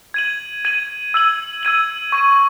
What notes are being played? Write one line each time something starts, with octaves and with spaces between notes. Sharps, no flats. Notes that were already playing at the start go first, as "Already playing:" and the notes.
G#6 D#7 F#7
G#6 D#7 F#7
E6 G#6 D#7 F#7
E6 G#6 D#7 F#7
C#6 G#6 D#7